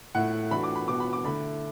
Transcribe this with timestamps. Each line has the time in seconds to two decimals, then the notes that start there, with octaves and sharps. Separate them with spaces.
0.15 A2 A3 E4 F#5
0.51 E3 A3 D4 F#4 B5
0.63 D6
0.75 B5
0.87 B2 B3 F#4 D6
1.00 B5
1.13 D6
1.24 D3 A3 E4 B5